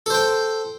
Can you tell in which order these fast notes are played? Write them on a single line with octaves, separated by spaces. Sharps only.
A4 C5 G5